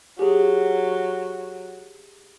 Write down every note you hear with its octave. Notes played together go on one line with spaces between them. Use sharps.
F#3 G4 G#4